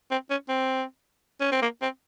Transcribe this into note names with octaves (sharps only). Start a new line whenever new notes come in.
C4
C#4
C4
C#4
C4
A#3
C4